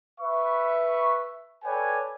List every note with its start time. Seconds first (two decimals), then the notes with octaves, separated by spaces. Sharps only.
0.21 B4 E5 C#6
1.65 A4 B4 C#5 D5 G5 G#5